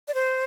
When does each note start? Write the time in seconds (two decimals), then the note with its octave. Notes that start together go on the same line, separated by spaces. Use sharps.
0.08 D5
0.14 C5